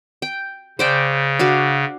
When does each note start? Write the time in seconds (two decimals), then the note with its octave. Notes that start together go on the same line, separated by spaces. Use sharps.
0.22 G5
0.79 C#3 C5 D5 G5
1.39 D4 F#4 F5